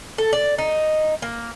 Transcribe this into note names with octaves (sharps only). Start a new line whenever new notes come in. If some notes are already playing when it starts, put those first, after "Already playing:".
A4
D5
D#4
A#3